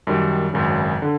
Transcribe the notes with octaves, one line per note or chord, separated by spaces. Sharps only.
F#2 D#3 G3
G#1 F#2 C#3
D3